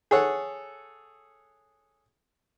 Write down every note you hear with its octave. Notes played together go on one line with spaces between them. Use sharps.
G#4 A4 C#5 F#5